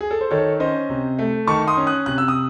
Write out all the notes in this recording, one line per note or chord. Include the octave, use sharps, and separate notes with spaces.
G#4
A4
C5
D#3 A4 C#5
C#4 C5 D#5
C3
A3
D#3 A5 C#6
C6 D#6
C#4
D#6 F#6
C3 F#6
E6
D#6